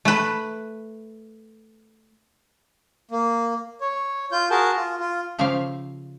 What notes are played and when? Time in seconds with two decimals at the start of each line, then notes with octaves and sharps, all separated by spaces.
0.05 A3 B4
3.11 A#3
3.81 C#5
4.32 F4 G6
4.51 F#4 G#4 A#4 A5
4.76 F4
5.00 F4
5.39 C#3 F3 A3 G4 C#5 F5